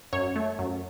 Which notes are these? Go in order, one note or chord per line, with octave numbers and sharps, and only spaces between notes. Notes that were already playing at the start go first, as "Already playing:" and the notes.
F#2 C#5
A3
F#2